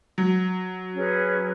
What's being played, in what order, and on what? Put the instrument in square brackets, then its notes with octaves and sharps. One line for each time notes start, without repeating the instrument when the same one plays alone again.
[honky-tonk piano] F#3
[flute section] C#4 G#4 B4